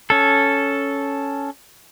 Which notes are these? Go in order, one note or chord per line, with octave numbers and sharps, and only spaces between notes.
C#4 A4